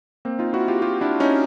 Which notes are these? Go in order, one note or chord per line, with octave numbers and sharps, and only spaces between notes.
A#3 C4
D#4 F4
E4 F#4
F4 G4
F4 G4
D4 E4
C#4 D#4